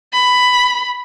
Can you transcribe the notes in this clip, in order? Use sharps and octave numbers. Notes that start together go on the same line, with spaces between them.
B5